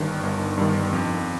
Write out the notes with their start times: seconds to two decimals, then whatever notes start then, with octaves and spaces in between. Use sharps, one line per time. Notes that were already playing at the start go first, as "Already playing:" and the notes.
Already playing: G1 G2 D#3
0.23 G1
0.58 G2 D#3
0.93 F2